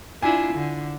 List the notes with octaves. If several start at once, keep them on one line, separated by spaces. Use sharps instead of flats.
D4 E4 F4 G#5
D3